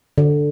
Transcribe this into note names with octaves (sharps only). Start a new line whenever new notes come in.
D3